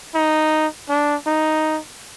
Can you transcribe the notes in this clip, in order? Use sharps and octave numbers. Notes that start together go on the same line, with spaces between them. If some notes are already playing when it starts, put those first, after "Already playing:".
D#4
D4
D#4